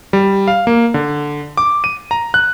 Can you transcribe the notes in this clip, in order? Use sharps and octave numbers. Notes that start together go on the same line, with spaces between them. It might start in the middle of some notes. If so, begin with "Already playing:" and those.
G3
F5
A#3
D3
D6
D#7
A#5
F#6